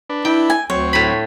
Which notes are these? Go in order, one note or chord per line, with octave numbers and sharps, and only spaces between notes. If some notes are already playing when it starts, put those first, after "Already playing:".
D4 B4
E4 G5
G#5
D2 F#3 C4 C#5
A2 B5